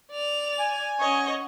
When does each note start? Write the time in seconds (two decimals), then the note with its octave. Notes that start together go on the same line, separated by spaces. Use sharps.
0.12 D5 F7
0.59 G#5
1.00 C#4 C#5 D#5 F#5